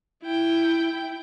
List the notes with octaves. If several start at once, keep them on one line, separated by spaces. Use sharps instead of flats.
E4 G5